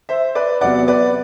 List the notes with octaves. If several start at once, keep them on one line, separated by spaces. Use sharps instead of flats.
C5 E5
B4 D5
E2 C3 F#3 B3 D5 F#5
B4 D5